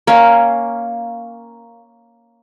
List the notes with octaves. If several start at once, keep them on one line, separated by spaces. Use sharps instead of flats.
A#3 C#4